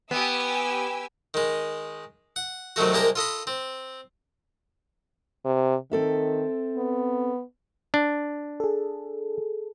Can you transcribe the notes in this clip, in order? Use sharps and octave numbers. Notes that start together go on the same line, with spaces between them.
B3 G4 G#5 E6
D#3 G#3
F#5
C3 D#3 F#3 A3 F#4
C2 G#3 A#3 G4 A5 A#5
F4 A4 D#5 B5
C4
C3
D#3 C4 A4 E5
B3
D4
G#4 A4